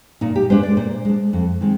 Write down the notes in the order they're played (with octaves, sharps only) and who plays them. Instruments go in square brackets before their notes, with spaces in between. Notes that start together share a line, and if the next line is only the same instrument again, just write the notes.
[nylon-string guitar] A#2 D#4
G4
G#3 D4 C5
D5
A#2 C5
G#3 D4
F2
D#3 G#3 C4